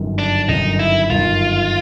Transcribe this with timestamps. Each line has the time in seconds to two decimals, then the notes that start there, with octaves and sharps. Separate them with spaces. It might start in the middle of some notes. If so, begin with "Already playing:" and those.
Already playing: G1 F#2 D#3
0.19 D4
0.49 G1 F#2 D#3 D#4
0.79 E4
1.10 G1 F#2 D#3 F4